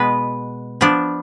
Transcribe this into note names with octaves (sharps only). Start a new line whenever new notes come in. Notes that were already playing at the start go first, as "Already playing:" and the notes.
Already playing: B2 G#3 B3 B4
F3 B3 D4